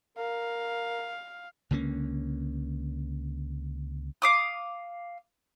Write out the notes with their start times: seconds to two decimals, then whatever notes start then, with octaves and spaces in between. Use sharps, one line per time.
0.18 A#4 F5
1.71 C#2 D3 A#3 C#4
4.22 F5 D6 D#6